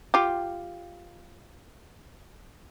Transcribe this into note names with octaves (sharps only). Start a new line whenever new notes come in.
F4 G4